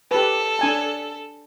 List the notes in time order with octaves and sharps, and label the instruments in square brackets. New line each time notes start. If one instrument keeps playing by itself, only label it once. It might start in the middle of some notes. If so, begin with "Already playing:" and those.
[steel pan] G4 B4 [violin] A4
[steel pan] D4 G#5 A5